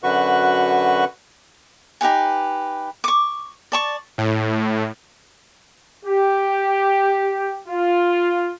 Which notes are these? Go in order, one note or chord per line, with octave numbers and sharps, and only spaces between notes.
F#2 D3 F#4 B4 C#6
D#4 G4 B4 G#5
C#6 D6
D5 A5 C#6
A2
G4
F4